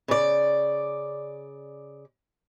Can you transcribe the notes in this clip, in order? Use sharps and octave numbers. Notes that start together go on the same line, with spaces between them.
C#3 D5